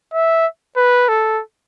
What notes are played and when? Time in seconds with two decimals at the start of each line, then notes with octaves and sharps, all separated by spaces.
0.14 E5
0.77 B4
1.09 A4